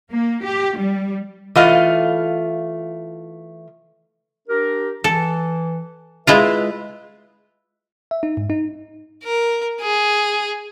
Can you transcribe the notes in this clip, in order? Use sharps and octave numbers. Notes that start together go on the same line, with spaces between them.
A#3
G4
G3
E3 A3 F4 D#5 F5
D4 G4 A#4
E3 A4
G#3 E4 F4 B4 E5
E5
D#4
G#2
D#4
A#4
G#4